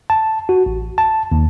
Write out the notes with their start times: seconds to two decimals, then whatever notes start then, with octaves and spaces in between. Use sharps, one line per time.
0.10 A5
0.49 F#4
0.66 A1
0.98 A5
1.32 D#2